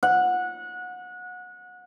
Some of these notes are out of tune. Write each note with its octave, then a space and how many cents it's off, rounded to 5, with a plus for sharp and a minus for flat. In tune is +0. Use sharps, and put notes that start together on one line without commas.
F#5 -25